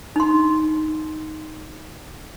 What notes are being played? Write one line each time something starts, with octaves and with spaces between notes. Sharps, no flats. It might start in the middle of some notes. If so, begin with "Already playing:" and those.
D#4 C6